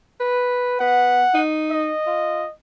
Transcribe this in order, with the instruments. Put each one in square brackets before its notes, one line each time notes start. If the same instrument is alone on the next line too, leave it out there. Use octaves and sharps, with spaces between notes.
[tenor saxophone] B4
[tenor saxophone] B3 [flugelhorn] F#5
[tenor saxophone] D#4
[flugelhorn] D#5
[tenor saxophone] F4